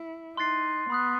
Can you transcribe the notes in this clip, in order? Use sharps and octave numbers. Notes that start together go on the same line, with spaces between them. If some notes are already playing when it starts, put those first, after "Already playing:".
Already playing: E4
D#4 C6 F#6 A6 C7
B3 B5 D#6 F#6